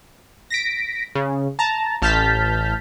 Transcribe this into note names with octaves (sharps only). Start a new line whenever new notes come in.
A#6 B6 D7
C#3
A5 A#5
A1 A5 F6 G6 A6 B6